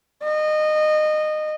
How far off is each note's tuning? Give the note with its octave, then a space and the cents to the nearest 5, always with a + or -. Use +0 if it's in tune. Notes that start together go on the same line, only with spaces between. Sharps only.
D#5 -20